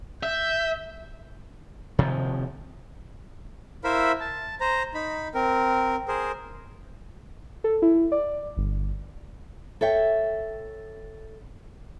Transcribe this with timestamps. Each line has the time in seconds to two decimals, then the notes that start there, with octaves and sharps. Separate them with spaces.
0.23 E5 G6
1.99 C3 D#3 F3
3.84 E4 A#4 C5 E5 F5 B5
4.21 A5
4.61 C5 A#5
4.94 D#4 B5
5.35 C4 A#4
6.08 G#4 A#4 C5
7.64 A4
7.82 E4
8.12 D5
8.57 G1
9.81 A4 C#5 E5 G5